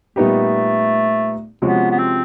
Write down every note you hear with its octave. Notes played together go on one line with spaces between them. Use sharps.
A#2 G3 A3 B3 D#4 G4
C3 F3 G#3 B3 C#4 F#4
B3
C4